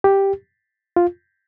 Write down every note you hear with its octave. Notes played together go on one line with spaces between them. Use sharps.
G4
F4